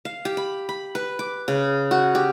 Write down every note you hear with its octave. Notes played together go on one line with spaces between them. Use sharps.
F5
G4
B5
B5
B4
D6
C#3
F#4
G4